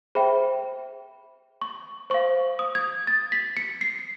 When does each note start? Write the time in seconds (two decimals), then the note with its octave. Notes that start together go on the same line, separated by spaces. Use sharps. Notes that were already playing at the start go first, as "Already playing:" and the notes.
0.15 G#4 C5 E5 G5 B5
1.62 C#6
2.10 C5 F5 C#6
2.59 D#6
2.75 G#6
3.07 A6
3.32 B6
3.57 C#7
3.81 C7